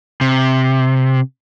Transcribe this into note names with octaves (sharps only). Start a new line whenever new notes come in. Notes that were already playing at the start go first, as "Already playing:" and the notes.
C3